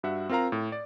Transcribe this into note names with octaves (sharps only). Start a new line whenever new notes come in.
G2 F#4 E5 F#5
C4 F4 A#4 F5 A#5
A2
D5